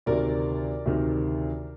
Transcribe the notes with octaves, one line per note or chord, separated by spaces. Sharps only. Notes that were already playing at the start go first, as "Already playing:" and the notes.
D2 C3 D#3 A#4 D5
D2 C3 D#3